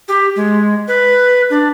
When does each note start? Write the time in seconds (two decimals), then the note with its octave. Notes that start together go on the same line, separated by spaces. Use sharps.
0.08 G4
0.36 G#3
0.88 B4
1.50 D4